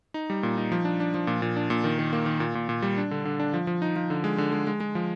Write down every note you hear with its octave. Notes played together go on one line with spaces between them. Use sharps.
D#4
G3
A#2
D#4
F3
D4
D4
F3
A#2
A#2
D4
A#2
D#3
D#3
A#3
D#3
A#2
A#2
A#2
G3
D4
D3
D3
D4
F3
F3
D#4
F3
D3
G#3
D3
G#3
G#3
G#3
F3